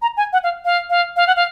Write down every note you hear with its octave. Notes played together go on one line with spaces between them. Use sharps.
A#5
G#5
F#5
F5
F5
F5
F5
F#5
F5